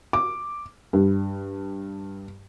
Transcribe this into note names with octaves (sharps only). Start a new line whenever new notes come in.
D6
G2